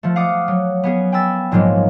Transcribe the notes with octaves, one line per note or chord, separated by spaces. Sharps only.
F3 A3
F5 F#5 D6 D#6
F#3
B3 C#4 G#4
G5 G#5 B5 E6 A6
A#1 G#2 F3 F#3 G#3 A#3